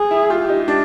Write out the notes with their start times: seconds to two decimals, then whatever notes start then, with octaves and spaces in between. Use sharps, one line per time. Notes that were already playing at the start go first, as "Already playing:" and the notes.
Already playing: G#4
0.11 E4
0.30 F4 G4
0.49 D#4
0.68 D4